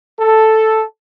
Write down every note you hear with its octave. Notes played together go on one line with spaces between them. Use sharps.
A4